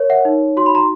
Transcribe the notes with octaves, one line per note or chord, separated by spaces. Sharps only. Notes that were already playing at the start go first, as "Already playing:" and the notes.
Already playing: A#4 C#5
E5 F#5
D#4
F#4 C6
B5
A#5 C6